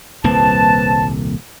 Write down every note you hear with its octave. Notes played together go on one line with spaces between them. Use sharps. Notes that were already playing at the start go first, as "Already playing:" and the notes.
D#1 C2 A#3 C4 B4 A5